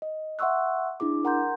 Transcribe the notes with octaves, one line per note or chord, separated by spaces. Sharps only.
D#5
E5 F#5 C6 C#6 E6 F#6
D4 E4 G#4 D6
A#4 F#5 A#5 C6 G6